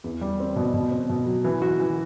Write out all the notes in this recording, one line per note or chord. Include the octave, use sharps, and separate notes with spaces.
E2
G3
C4
B2
B2
C4
B2
F#3
E3
F#4
E3